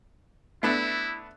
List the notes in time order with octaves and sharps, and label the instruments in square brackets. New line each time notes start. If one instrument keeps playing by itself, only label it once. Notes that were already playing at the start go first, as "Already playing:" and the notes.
[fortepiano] A3 B3 D4 [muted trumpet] E4